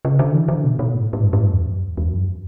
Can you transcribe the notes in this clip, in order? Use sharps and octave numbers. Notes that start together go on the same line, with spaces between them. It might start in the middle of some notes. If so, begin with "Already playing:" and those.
C#3
D3
E3
D3
B2
B2
A2
A2
G2
A2
G2
E2
F#2
E2
E2
F#2